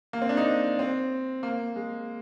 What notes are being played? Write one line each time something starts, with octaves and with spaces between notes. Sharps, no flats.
A#3
C4
D4
D#4
C4
A#3
G#3